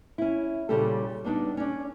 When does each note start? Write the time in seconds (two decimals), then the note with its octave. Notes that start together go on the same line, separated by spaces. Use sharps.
0.18 C#4 E4
0.69 A#2 C#3 G3 C#4 G4 A4
1.24 G3 B3 D4 D#4
1.57 C#4 D4